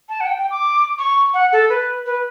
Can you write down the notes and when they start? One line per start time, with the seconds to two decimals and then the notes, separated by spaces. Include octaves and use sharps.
0.09 A5
0.21 F#5
0.26 G5
0.38 G5
0.51 D6
0.98 C#6
1.34 F#5
1.52 A4
1.69 B4
2.06 B4